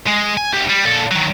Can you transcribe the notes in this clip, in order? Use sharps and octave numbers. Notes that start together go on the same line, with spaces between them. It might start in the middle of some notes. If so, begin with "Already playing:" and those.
G#3
G#5
D2 G4
G3
A#2 A4
D#3 F#3